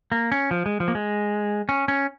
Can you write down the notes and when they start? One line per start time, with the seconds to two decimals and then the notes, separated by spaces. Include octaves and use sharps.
0.12 A#3
0.32 C#4
0.51 F3
0.66 G#3
0.80 F3
0.88 A#3
0.95 G#3
1.69 C#4
1.88 C#4